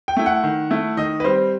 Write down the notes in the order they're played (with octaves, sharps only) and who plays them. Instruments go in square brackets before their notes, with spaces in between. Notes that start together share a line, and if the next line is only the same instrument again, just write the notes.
[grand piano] G5
A3 E4
F#5
D#3
A3 E4
D#3 D#5
B4
G3 C4 C5